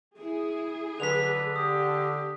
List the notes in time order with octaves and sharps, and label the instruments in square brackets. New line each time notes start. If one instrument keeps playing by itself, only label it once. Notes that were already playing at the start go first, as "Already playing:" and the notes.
[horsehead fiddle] E4 [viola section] G#4
[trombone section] D3 [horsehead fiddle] F#3 B4 [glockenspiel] B6 F7
[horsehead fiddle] G4 [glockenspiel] D#6